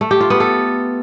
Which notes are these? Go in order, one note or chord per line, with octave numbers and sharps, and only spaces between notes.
A3
G4
F4
B3
A4